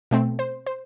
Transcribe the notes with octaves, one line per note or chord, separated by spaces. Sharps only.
B2 A3 C4
C5
C5